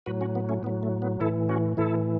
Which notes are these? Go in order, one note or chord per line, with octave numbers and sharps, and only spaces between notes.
A2 F#3 F#4 B4
C#4 F#4
B3
A3 C#4
A2 F#3 B3
A3
B3
A2 E3 E4 A4
C#4 F#4
A2 E3 E4 A4